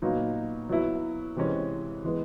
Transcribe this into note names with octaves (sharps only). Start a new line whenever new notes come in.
A#2 F#3 B3 D#4
F#3 B3 E4
C3 E3 G#3 C#4
E3 G#3 B3